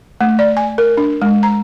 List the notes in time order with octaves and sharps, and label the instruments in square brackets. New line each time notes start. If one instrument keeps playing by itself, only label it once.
[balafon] A3
D5
G#5
A#4
D4
G#3
A#5